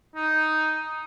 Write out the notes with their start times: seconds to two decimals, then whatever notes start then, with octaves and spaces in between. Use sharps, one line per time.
0.15 D#4